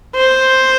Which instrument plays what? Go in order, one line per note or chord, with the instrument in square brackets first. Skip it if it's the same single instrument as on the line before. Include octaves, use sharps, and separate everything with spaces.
[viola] C5